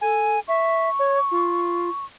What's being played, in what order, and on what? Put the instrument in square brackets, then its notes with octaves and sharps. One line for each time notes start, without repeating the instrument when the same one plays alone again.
[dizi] A4 [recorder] G#5
[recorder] E5 [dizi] C#6
[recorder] C#5
F4